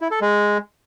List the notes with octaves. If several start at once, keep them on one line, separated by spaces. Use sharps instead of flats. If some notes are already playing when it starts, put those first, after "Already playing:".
E4
A4
G#3